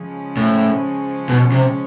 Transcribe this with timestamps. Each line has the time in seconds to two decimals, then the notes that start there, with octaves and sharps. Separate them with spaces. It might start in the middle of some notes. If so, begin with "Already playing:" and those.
Already playing: C#3 F3 G#3 C#4
0.37 A2
1.29 B2
1.52 C3